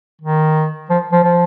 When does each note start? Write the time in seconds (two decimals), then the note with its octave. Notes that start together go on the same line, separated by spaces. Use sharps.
0.21 D#3
0.90 F3
1.12 F3
1.24 F3